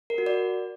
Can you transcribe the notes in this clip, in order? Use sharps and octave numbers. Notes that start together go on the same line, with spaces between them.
A#4
F#4
D5